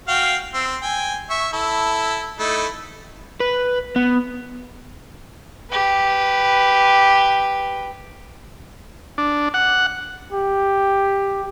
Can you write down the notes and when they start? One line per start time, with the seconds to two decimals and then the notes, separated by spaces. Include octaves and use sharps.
0.08 F#4 F5 G5
0.54 C4 E6
0.82 G5 G#5
1.30 E5 C#6
1.53 E4 A4
2.39 A3 D#4 E4
3.40 B4
3.96 B3
5.70 G4 B4
9.18 D4
9.54 F#5
10.33 G4